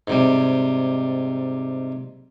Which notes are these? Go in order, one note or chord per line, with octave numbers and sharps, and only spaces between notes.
G#2 C3 G3